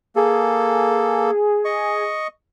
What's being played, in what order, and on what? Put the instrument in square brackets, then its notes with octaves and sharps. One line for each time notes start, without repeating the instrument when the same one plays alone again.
[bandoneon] A#3 A4 [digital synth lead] G#4
[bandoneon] D#5 C#6